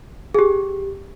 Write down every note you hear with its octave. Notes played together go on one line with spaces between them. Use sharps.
G#4
G4